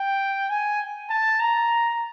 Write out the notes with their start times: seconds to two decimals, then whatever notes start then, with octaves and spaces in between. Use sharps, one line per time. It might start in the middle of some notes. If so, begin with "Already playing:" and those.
Already playing: G5
0.50 G#5
1.10 A5
1.40 A#5